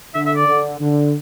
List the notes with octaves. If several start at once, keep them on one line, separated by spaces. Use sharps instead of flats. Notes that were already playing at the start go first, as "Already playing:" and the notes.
D3 E5
E5
D5
D3
D3